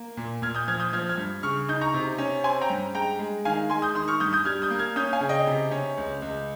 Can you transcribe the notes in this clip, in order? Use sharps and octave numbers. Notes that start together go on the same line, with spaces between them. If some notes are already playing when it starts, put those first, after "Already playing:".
Already playing: A#3
A#2
A#2 F6 G#6
D#6 G6
F3 F6 G#6
D#6 G6
F3 F6 G#6
F6 G#6
G2
C#3 C#6 F6
D#4 D#6 G6
A#5 C#6
C3
C#4
C4 G#5 C6
G5 A#5
G2
G#3 G5 A#5
G#3
D#3 F5 G#5
G#3 G#5 C6
D#6 G6
D#3 C6 D#6
C#6 F6
G2 D#6 G6
D#6 G6
G3 F6 G#6
D#6 G6
A#3
F6 G#6
C#4 D#6 G6
F5 G#5
C#3
D#5 G5
C3
C#4
C#2
C#2